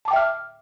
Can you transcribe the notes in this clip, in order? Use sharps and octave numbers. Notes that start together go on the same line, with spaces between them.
E5 G5 A5 D6 F6